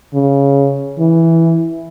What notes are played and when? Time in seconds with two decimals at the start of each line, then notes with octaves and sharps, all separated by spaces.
0.14 C#3
0.98 E3